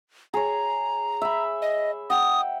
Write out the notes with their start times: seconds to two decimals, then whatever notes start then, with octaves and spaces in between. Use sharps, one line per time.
0.34 G#4 C#5 A#5
1.22 E5 B5
1.62 D#5
2.10 F#5 G5 D#6